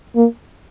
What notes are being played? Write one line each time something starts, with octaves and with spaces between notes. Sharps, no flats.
A#3